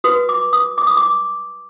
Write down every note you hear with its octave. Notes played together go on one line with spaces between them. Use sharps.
F#4 B4 D#6
D6
D#6
D6
D#6
D6